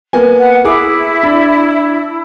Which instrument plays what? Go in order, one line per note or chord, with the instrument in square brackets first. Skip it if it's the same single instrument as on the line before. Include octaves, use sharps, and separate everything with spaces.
[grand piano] A#3 B3 G#5
[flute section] F#5
[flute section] E4 [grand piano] G#4 D6
[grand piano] D4